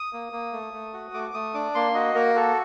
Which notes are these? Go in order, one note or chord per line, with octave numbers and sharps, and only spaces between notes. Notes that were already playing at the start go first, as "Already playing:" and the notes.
Already playing: D#6
A#3
A#3
A3
A3
F#4
A3 D6
A3 D#6
D4 D6
A#3 C6
F#4 D#5
A#3 A#4
F#4 A4